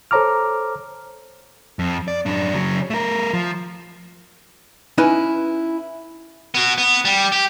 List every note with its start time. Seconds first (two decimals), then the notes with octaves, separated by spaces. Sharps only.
0.11 A4 C5 C#5 A#5 D6 F6
1.79 F2
2.08 D5
2.26 F#2 D4
2.54 C#3 F#3
2.90 A3 A#4
3.33 F3
4.98 C#4 D#4 E4 B4 G#5
6.55 B3 F#4
6.78 B3
7.05 G3
7.32 G4